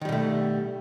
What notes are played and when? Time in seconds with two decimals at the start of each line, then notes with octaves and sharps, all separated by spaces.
0.01 D#3
0.05 G3
0.09 B2
0.12 A3